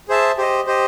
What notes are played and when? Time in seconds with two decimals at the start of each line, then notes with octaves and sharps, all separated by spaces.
0.08 G#4 C5 E5 A5
0.38 G4 C5 D#5
0.67 G4 C5 D#5